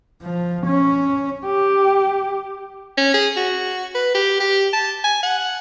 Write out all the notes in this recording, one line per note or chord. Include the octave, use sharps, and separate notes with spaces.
F3
C#4
G4
C#4
G#4
F#4
B4
G4
G4
A5
G#5
F#5